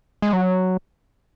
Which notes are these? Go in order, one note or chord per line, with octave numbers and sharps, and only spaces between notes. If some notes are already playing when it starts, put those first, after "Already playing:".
G#3
F#3